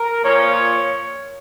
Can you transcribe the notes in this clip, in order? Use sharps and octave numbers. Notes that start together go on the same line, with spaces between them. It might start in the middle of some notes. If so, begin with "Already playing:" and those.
Already playing: A#4
A#2 F3 C#5